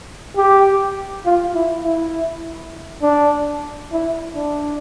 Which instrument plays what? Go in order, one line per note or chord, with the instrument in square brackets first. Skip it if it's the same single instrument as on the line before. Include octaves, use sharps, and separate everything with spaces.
[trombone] G4
F4
E4
E4
D4
E4
D4